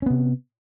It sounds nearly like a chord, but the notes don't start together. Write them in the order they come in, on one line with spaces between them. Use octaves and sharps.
C#4 B3 C3